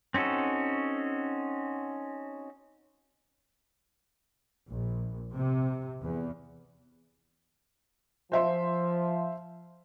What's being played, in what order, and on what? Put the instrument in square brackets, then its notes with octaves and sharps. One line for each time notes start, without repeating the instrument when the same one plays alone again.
[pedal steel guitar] C4 C#4 D#4 F#4 A4
[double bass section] A#1
C3
E2
[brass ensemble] F3 [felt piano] C5 E5 C6